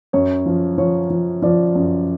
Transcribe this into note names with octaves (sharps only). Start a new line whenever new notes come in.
F#2 C#5
F3
F3 C#5
F3
F3 D5
F#2